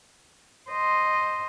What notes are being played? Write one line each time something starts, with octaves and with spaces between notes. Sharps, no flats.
C5 D#5